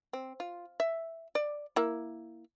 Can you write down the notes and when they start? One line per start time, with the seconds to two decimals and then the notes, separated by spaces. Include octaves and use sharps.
0.13 C4
0.40 F4
0.80 E5
1.35 D5
1.76 A#3 E4